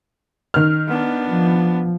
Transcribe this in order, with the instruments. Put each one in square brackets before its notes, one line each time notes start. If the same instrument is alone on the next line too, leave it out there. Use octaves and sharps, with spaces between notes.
[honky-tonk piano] D#3 F6
[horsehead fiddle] B3 D4
[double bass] F3